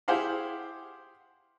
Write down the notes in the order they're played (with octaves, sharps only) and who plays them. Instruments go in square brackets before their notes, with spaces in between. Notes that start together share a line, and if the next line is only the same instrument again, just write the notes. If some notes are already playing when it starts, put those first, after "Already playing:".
[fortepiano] E4 G4 G#4 C5 F5 F#5